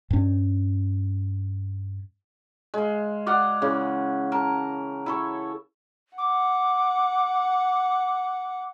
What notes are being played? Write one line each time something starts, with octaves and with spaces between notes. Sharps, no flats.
G2 C#4
G#3 F5
D5 D#5 F5 F#5
C#3 E3
A#4 A5
E4 A4 C#5
F#5 D6